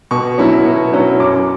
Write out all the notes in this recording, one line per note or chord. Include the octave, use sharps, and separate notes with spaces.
B2 C#6
F#3 C#4 E4
B2
F#3 C#4 E4
F#2 D6